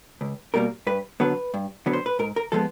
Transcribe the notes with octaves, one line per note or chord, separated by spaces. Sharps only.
C#2
B2 G3 A#3 A#4
G2 B4
D3 F#3 B3 B4
G2
D3 F#3 B3
C5
B4
G#2 A#4
A#4
F3 G#3 B3 A4